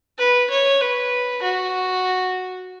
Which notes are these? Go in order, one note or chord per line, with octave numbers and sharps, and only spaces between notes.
B4
C#5
B4
F#4